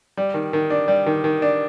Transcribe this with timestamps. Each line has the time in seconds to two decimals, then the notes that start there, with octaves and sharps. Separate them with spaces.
0.17 G3
0.34 D#3
0.53 D#3
0.70 D4
0.88 G3
1.06 D#3
1.24 D#3
1.42 D4